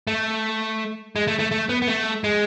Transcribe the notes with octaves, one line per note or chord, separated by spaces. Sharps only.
A3
G#3
A3
A3
A3
B3
B3
A3
G#3